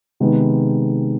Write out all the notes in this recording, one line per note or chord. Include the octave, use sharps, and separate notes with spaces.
C3 D#3 G#3 B3